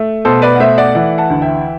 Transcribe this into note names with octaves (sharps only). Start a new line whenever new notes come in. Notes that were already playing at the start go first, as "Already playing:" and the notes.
Already playing: A3
B2 A4 C5
B4 D5
F#5
A3 C5 E5
D5 F#5
E3 D5 F#5
F#5 A5
D2
E5 G5